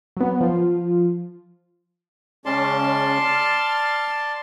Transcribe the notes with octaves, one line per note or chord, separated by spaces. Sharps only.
F#3 B3
F3 F4
C#3 G#3 C#4 D5 A5 C6
F6